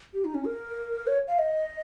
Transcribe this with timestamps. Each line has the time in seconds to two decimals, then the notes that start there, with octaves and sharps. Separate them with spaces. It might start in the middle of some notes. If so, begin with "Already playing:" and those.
0.14 G4
0.25 D#4
0.34 C#4
0.45 A#4
1.07 C#5
1.28 F5
1.39 D#5